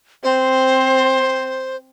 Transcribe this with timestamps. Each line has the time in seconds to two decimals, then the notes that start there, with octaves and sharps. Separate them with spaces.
0.23 C4 C5